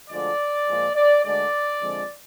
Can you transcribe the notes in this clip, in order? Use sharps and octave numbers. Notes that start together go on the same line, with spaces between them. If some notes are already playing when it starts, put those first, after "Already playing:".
D2 D3 F3 G#3 D5
A#2 F3 G#3
D5
D2 D3 G#3 D5
F2 D3 F3 G#3